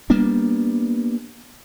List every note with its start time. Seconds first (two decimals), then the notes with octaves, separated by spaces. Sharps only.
0.10 G3 A#3 B3 D4